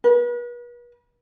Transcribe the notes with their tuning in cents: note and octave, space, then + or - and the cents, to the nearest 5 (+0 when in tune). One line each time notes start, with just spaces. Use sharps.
B4 -40